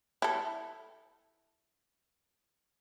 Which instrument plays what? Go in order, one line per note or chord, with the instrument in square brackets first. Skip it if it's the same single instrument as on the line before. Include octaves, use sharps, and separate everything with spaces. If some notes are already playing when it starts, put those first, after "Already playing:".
[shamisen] E4 A4